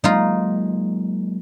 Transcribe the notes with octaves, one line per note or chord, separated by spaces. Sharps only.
F#3 G#3 A#3 D#4 F4